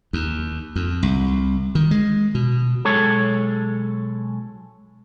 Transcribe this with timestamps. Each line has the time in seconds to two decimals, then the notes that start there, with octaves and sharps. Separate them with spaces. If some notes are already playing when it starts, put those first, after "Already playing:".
0.13 D#2
0.76 F2
1.03 C2
1.75 D#3
1.91 G#3
2.35 B2
2.85 B1 G#3 A4 C#5